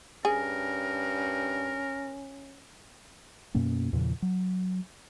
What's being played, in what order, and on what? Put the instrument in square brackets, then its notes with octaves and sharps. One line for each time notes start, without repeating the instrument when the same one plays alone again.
[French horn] G2 [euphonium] C#4 [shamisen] G#4 [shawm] A#4
[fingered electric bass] F#2 B2 A#3 C#4
E2 A#2 C#3 F3
F#3